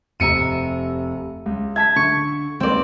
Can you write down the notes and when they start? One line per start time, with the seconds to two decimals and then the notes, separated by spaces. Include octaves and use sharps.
0.20 F1 C3 E5 A#5 C#7 D#7
1.46 C#2
1.76 E5 A5 G#6 B6
1.96 D3 C#6
2.60 C#2 A#3 C4 B4 D5